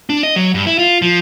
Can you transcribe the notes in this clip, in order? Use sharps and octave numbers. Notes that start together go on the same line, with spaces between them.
D4
D#5
F#3
G2
E4
F4
F3